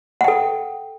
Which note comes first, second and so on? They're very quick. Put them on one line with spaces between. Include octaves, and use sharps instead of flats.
F#5 G5 A4